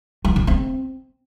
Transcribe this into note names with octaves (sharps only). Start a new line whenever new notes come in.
F3
C#3
C4